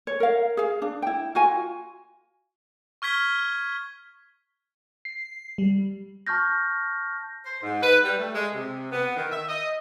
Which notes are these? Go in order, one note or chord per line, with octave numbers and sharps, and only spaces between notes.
C#5
A#4 F5
G#4 F5
D4
E4 G5
F4 F#4 G#5
C#6 F6 G#6 B6 G7
C7
G3
A5 C#6 F6 G6 A#6
C5
G#2
B4
G3
A3
G#3
C3
B3
D#3
E5
D#5